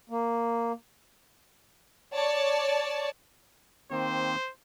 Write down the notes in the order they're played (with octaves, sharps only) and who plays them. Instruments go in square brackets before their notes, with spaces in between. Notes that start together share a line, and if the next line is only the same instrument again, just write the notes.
[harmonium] A#3
[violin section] C#5 D5 A5
[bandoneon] D#3 A#3 C4 [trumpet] C5